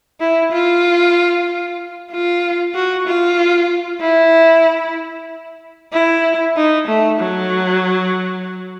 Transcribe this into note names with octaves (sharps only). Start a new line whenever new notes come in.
E4
F4
F4
F#4
F4
E4
E4
D#4
A3
F#3